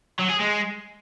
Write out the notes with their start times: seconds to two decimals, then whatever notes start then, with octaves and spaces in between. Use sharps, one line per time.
0.19 F#3
0.29 G#4
0.40 G#3